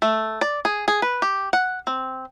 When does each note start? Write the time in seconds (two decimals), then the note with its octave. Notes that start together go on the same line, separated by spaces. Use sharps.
0.02 A3
0.41 D5
0.65 G#4
0.88 G#4
1.02 B4
1.22 G4
1.53 F#5
1.87 C4